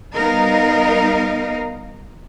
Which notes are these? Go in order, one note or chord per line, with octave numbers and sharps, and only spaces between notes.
G3 B3 D#4 A#4 D#5 F5